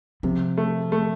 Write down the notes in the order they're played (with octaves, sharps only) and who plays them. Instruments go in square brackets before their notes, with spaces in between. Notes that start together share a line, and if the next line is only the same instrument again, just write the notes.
[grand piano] C3 [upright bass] F3
[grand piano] A3
A3